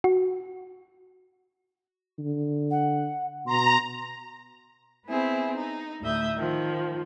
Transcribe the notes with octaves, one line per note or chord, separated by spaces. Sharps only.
F#4
D3
F#5
B2 A#5 C6
B3 C4 E4 G#4
D#4
D2 A2 E5 D#6 G6
D#3 F3